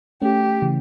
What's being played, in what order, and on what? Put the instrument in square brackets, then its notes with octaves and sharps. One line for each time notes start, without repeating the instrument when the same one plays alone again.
[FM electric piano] A3 C#4 [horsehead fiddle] G4
[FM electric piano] C#3 E3